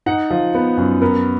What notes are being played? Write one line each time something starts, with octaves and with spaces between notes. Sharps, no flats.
D#4 F#5
F3
B3
F#2
B3 A#4